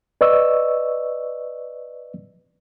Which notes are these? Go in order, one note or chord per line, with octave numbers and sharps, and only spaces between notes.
B4 D5 D#5 C#6 E6